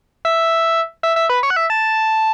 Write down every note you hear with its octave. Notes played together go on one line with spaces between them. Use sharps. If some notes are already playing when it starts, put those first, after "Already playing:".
E5
E5
E5
B4
C#5
F#5
E5
A5